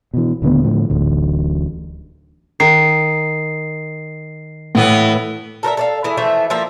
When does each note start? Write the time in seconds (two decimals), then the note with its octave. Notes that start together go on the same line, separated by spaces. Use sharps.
0.14 B2 E3
0.42 D#1 D3 A3 B3
0.64 A2 D3 F3
0.90 D1 A1 D2
2.60 D#3 C7
4.75 A2 E3 A3 B3
5.63 A4 A#4 C5 E5
5.77 A4 D5 F5
6.04 E3 E4 G#4
6.17 E3 F3 A3 E5
6.50 F3 A#3 E5